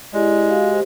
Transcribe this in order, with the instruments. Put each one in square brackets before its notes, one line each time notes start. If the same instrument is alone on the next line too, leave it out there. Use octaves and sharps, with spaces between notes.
[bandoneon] G#3 [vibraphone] E4 G4 D5
[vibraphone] F#4 G4 F5
G4 C5